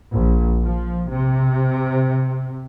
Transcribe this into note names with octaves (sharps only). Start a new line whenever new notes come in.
A#1
F3
C3